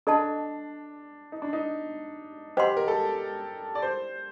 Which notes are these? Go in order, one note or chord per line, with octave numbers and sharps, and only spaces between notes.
D4 A4 D#5 A5
D#4
D4
D#4
G4 C5 D#5 F#5 C6
A#4
A4
D5
C5